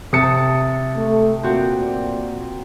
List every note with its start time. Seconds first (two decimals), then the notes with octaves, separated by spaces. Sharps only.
0.13 C3 E5 A5 D#6 C#7
0.95 A3
1.43 A#2 C4 F#4 G4